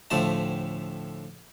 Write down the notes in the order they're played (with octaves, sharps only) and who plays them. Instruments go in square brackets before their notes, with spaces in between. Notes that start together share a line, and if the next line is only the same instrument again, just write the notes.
[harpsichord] D2 A2 F3 A3 A5